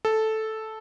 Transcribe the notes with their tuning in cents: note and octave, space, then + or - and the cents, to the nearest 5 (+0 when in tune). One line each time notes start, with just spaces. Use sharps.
A4 -5